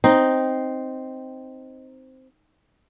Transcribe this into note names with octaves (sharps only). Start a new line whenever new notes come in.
C4 D#4